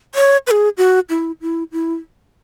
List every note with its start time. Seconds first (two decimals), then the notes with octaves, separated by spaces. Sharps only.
0.15 C#5
0.47 B4
0.51 G#4
0.78 F#4
1.10 E4
1.41 E4
1.72 E4